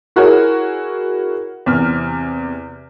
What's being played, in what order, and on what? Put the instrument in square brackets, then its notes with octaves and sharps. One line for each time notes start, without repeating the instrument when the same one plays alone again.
[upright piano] E4 F#4 G#4 A#4 C#5
E2 C3 F6